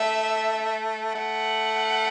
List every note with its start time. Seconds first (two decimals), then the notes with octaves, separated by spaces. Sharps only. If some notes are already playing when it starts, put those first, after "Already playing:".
Already playing: A3 E5
1.15 A3 F#5